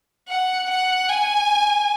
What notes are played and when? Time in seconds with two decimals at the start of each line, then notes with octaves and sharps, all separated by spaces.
0.29 F#5
0.70 F#5
1.09 G#5